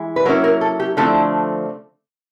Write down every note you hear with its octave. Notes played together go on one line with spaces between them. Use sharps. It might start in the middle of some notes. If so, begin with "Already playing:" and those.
Already playing: E3 G#3 E4
B4
F#3 A#3 C#4 E4 A#4
A#4
A4
G4
D3 F3 A3 C4 E4 A4